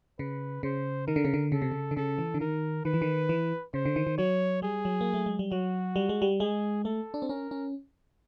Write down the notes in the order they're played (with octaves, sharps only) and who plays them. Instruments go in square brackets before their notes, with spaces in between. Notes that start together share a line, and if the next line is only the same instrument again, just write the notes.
[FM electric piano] C#3 [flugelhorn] B4
[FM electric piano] C#3 [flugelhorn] C5
[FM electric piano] D#3 [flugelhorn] A#4
[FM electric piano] D3
C#3
D3
[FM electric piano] C#3 [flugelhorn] A4
[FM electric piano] C3
C#3
D3
[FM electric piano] C#3 [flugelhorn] A4
[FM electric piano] E3
D3
[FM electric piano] D#3 [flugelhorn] A#4
[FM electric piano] D#3 [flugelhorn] B4
[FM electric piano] E3
D#3
E3
[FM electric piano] C#3 [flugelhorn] C5
[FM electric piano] D3
D#3
D#3
[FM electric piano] F#3 [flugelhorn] C#5
[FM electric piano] G3 [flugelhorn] G#4
[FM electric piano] F#3
A#3
A3
G#3
G3
[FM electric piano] F#3 [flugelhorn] F#4
[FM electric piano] G3
G#3
G3
[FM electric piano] G#3 [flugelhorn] G#4
[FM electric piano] A3 [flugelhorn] A4
[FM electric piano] D4
C4
[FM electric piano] C#4 [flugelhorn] A#4
[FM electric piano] C#4